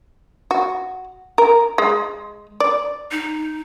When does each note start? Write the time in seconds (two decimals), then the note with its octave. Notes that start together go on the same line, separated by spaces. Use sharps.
0.51 F#4
1.38 A#4
1.78 G#3
2.60 D5
3.11 D#4